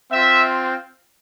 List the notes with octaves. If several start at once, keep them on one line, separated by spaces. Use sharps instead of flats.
C4 F4 E5